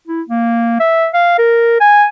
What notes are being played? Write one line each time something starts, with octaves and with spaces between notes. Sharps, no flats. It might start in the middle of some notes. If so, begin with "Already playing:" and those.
E4
A#3
E5
F5
A#4
G#5